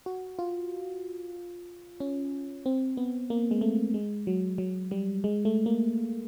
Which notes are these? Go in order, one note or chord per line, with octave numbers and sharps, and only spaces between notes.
F#4
F4
C#4
C4
B3
A#3
G#3
A3
G#3
F#3
F#3
G3
G#3
A3
A#3